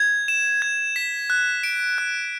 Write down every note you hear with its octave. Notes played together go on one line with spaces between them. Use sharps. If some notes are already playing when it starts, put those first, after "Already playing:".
Already playing: G#6
E7
G#6
B6
F#6
D7
F#6